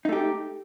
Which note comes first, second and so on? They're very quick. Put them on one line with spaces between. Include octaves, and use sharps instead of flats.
D#4 A3 G4